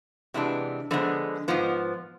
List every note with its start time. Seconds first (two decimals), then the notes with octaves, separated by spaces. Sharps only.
0.34 C3 E3 G#3 B3 D4
0.91 D3 F3 G#3 B3
1.48 G#2 F3 B3